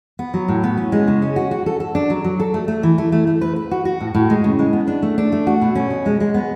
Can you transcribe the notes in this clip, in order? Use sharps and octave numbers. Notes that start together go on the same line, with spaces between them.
B3
F#3
A2
B3
C#4
G#3
C#3
C#4
F#4
F#4
A4
A4
D4
F#3
F#3
A4
A3
A3
E3
A3
A3
A3
B4
B4
F#4
F#4
A2
A2
G#3
C#3
G#3
B3
D4
A3
D4
A3
F#4
B2
C#4
B2
G#3
G#3
B3